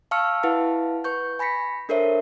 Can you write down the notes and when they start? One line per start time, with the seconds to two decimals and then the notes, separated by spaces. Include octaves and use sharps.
0.11 F5 A5 C#6 E6 F6 C#7
0.43 E4 B4 F5 F#5 A5
1.04 B4 C#6 G6
1.39 G#5 B5 A#6 B6 C#7
1.89 D4 A4 A#4 C5 C#5 E5